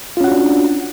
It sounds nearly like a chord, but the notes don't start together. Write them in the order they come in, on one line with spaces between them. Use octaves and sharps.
F4 C#4 F#5 F#4 D4